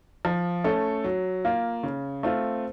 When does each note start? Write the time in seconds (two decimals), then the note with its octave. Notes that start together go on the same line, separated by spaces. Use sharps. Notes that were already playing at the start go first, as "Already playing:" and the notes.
0.25 F3
0.64 A3 C#4 A4
1.04 F#3
1.45 A#3 F4
1.83 C#3
2.23 A3 C4 F4